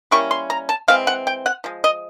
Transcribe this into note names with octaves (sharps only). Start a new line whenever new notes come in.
G3 A#3 C#4 E4 C#6
C6
A#5
A5
E3 G#3 C4 F5
F#5
G5
F#5
F3 G#3
D#5